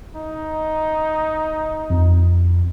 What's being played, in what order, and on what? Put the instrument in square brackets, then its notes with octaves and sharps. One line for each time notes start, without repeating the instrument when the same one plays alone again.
[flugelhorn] D#4
[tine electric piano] F2